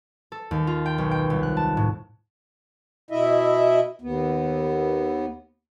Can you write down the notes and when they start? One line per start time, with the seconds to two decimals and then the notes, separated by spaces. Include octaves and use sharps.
0.32 A4
0.51 D#2
0.67 F4
0.86 G5
0.98 B1
1.11 G5
1.30 C2
1.43 F#6
1.57 A5
1.77 A2
3.11 B2 E4 D#5 E5
4.02 D#2 B3